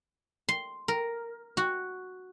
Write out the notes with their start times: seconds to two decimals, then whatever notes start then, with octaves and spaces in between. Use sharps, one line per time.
0.49 C6
0.88 A#4
1.57 F#4